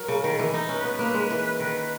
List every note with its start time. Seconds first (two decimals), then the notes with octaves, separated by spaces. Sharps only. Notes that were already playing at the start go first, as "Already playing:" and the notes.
Already playing: F#3 A#4
0.08 C#3
0.24 D#3
0.39 E3
0.54 D#4
0.69 C#4 B4
0.84 B3
0.99 A#3 B4
1.14 G#3
1.30 E3 B4
1.60 D#3 B4